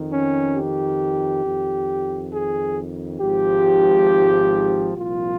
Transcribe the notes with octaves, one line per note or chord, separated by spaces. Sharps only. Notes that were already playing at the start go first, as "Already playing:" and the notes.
Already playing: F2 D#3
C#4
G4
F2 D#3
G#4
G#1 G#2 F3 G4
C2 A#2 F3 F4